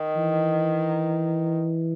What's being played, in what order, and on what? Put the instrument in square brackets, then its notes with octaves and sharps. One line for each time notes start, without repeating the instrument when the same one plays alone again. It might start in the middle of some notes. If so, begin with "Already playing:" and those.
Already playing: [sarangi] D#3
[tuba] E3